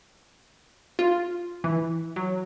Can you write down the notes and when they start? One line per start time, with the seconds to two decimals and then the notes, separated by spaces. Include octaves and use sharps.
0.99 F4
1.64 E3
2.16 F#3